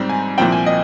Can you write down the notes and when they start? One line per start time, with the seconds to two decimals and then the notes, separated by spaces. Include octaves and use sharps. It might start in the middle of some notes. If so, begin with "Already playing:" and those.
Already playing: G#2 G3 C4
0.09 G#5
0.38 C2 A#2 F3 C4 G5
0.52 G#5
0.66 D#5